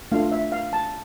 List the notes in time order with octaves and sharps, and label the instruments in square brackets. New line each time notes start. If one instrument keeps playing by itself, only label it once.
[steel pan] A3 D4 F4 F5
E5
F5
A5